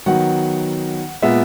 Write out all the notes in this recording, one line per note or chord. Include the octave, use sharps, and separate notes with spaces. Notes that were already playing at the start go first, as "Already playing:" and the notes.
D#3 F#3 B3 F#5
A#2 G#3 B3 E5